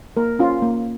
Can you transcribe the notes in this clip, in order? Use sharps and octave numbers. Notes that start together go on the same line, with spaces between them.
A#3 A#4
C#4 F4
A#3